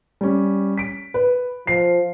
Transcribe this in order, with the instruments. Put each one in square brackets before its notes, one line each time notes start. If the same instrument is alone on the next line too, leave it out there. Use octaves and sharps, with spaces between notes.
[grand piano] G3 C#4
B6 D7
[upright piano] B4
[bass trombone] F3 [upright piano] C7